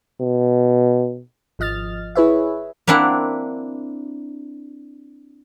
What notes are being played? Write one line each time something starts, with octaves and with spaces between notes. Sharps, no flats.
B2
G#1 F3 D#5 F6 A6
E4 G#4 B4 C#5 E5
A#3 C4 D4 E4 F#5